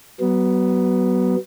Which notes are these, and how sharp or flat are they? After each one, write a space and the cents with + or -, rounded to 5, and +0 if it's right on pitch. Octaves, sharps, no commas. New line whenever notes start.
F#3 +30 B3 +0